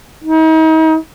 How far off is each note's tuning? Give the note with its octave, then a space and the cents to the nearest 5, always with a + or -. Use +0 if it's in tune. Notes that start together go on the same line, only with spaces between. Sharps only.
D#4 +40